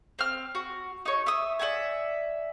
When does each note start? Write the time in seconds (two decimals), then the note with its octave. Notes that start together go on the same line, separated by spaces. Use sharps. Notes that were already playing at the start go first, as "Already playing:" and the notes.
0.19 C4 F6
0.55 F#4
1.05 D#4 C#5
1.26 E5 D#6
1.59 D5 E5 F#5 G#5